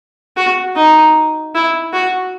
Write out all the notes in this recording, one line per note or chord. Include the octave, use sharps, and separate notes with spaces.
F#4
D#4
E4
F#4